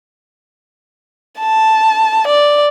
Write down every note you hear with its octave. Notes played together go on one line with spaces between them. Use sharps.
A5
D5